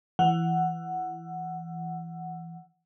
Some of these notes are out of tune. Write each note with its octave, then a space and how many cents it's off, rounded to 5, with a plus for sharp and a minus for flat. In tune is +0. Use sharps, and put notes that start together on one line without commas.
E3 +15 F#5 +0